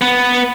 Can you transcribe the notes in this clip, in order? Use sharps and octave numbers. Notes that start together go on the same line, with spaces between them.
B3